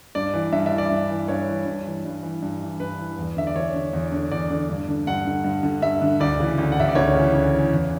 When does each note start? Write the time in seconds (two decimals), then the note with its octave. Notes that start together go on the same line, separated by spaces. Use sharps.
0.15 G2 D5
0.34 E3
0.52 G2 E5
0.66 E5
0.72 E3
0.78 D5
0.91 G2
1.10 E3
1.28 G2 C#5
1.48 E3
1.66 G2
1.86 E3
2.05 G2
2.23 E3
2.42 G2
2.62 E3
2.80 G2 B4
2.99 E3
3.18 E2
3.37 D3 E5
3.47 D5
3.55 E2 C#5
3.74 D3
3.93 E2
4.12 D3
4.31 E2 D5
4.51 D3
4.69 G2
4.88 D3
5.07 G2 F#5
5.25 D3
5.44 G2
5.63 D3
5.82 G2 E5
6.02 D3
6.20 D2 D5
6.39 C#3 E3
6.58 D2
6.72 F#5
6.77 C#3 E3 E5
6.89 D5
6.95 D2 C#5
7.15 C#3 E3
7.33 D2
7.53 C#3 E3
7.71 E2